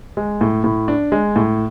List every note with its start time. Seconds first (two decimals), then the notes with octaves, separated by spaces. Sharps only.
0.17 G#3
0.41 A2
0.64 A2
0.88 D4
1.12 G#3
1.36 A2